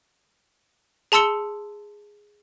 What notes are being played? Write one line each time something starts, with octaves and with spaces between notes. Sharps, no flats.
G#4 A5 C6 E6 C#7 G7